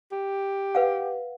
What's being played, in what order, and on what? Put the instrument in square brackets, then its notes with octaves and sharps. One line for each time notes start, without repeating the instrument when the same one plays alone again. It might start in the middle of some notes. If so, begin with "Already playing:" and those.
[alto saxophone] G4
[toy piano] B4 F5 F#5